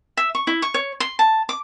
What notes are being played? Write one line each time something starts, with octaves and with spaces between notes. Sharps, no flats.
E5
C#6
E4
C#6
C#5
C6
A5
D6